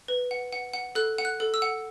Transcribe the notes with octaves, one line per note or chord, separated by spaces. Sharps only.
B4
F#5
F#5
F#5
A4 F#6
F#5
F#6
A4
E6
F#5